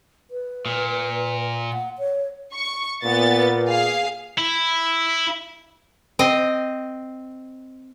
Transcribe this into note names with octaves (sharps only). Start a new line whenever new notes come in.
B4
A#2
F#5
C#5
C#6
A#2 B3 A6
G#4 F5
E4
C4 D#5